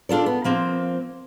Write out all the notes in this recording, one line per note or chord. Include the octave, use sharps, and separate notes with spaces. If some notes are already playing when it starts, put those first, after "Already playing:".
D4 F4 A4 D5
B3
F3 A#3 C4